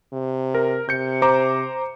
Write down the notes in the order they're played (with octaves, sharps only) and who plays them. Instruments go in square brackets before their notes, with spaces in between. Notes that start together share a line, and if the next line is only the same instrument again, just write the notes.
[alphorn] C3
[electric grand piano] A#4
[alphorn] C3 [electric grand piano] G6 C#7
[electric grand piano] C5 A#5 D6